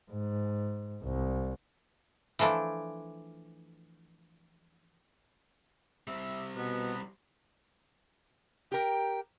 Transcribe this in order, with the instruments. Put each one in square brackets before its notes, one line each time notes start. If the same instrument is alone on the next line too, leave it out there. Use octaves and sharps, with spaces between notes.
[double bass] G#2
C2
[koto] E3 F3 A3 D4 E4
[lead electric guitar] G3 C4 [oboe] E5
[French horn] B2 [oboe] B3
[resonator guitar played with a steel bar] G4 A#4 [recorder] G5